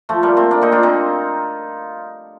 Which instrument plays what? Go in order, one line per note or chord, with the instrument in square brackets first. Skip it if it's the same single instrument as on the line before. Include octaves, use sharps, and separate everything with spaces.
[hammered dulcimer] F3 A3
G3 A#3
A3 C4
A#3 D4
C4 D#4
D4 F4
C4 D#4